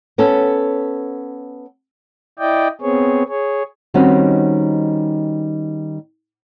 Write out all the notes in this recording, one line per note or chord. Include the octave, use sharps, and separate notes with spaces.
B3 C#4 A4
E4 D5 D#5 G5
B3 C4 G#4 C#5
G#4 C#5
D#3 G3 C4 C#4 D#4 F#4